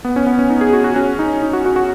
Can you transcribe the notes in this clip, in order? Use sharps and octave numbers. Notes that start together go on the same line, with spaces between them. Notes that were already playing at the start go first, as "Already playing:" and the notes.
B3
C#4
B3
C#4
D#4
G#4
F#4
F#4
C#4
D#4
D#4
F#4
F#4
F#4